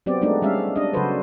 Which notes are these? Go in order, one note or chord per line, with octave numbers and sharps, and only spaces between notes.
F#3 B3 C4 G4 D5
G#3 A3 B3 D4 D#4
G3 G#3 C#4 E5 F5
D4 D#5
C#3 F#3 F#4 A4 B4 C5